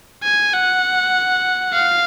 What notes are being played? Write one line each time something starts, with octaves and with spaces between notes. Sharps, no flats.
G#5
F#5
F5